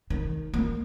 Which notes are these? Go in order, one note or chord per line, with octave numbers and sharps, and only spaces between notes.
D#3
A#3